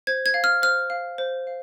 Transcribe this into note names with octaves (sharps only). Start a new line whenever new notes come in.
C5 G#6
G#6
F5
F6
C5 F6
F5
C5
F5